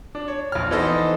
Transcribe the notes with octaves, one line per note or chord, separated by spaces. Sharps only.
D4
C#5
A#1 F6
E3 B3 D#4 A4 C5 D#5